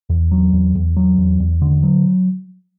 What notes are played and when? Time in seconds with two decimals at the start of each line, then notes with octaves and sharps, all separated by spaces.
0.10 E2
0.31 F#3
0.53 E2
0.75 E2
0.97 F#3
1.18 E2
1.40 E2
1.62 D3
1.83 F#3